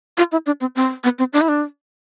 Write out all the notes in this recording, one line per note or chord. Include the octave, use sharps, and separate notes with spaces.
F4
E4
D4
C4
C4
B3
C4
D4
E4
D4